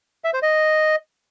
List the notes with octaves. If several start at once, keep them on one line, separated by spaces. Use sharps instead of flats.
E5
C5
D#5